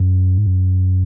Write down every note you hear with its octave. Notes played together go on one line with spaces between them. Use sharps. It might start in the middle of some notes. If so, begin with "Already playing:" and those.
Already playing: F#2
G#2
F#2